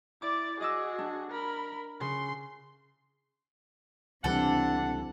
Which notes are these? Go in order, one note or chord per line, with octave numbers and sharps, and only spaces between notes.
E4 D5 D6
F#4 G#4 D#5 D6 E6
D4
A#4 B5
C#3 C6
C#2 C3 E3 G3 D4 A4 F#5